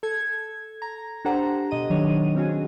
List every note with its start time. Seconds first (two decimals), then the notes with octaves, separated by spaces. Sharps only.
0.03 A4 G#6
0.82 A#5
1.25 D4 G4 A4 C5 F#5 A#5
1.71 B2 D#5 D#7
1.90 D#3 F#3 D4 C#5
2.35 C4 C#4 F#4 G#4